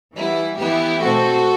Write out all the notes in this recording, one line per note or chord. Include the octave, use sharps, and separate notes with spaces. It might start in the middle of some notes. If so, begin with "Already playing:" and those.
E3 G3 B3 E4
E3 B3 E4 G4
B2 A3 C4 F#4 A4